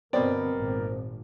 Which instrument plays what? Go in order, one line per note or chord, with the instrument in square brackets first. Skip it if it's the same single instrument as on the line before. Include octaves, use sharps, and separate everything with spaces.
[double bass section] G2 D3 [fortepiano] B2 B3 D5 [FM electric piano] C4 [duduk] A#4
[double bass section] G#1 A#2